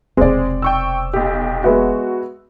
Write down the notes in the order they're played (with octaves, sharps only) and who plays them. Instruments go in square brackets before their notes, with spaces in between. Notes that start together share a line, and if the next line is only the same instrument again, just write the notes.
[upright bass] E1 C3 [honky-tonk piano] G#3 [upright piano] C4 D5
[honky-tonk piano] G5 C#6 E6
B1 G4
[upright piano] G#3 B3 E5 [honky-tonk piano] F#4